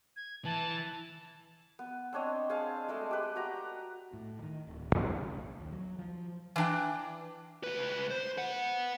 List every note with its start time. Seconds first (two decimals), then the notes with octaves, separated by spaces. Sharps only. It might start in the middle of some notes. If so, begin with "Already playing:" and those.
0.16 G#6
0.45 E3 A5
1.79 B3
2.13 C4 D4 C#5 D#5
2.50 G#4 C5 F5 A5
2.88 G#3 A3 D#5
3.11 G4 B4
3.35 F#4 B4 G5 A#5
4.13 A2
4.42 D#3
4.67 D1
4.95 A#1
5.17 C#3
5.36 A#1
5.60 D#2
5.72 F#3
5.98 F3
6.56 E3 D4 G5
7.64 C#2 B4
8.11 C5
8.38 B4 F#5